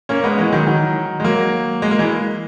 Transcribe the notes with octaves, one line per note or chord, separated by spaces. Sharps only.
A#3 C#4
G#3 B3
E3 G#3
D#3 F#3
D#3 F#3
G#3
F#3 A#3
G#3
A#3
E3 G#3